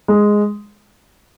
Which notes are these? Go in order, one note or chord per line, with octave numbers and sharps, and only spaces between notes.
G#3